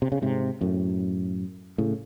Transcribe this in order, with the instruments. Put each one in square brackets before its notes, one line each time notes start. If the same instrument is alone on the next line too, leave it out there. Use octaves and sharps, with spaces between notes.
[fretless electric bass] C3
C#3
G#2 C3
F#2 A2
A2 C#3